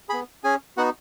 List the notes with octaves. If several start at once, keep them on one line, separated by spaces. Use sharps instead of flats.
B3 G#4 B5
C#4 G#4 G#5
B3 D#4 F#4 F#5